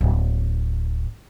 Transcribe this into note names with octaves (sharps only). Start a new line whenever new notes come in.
D1 A#3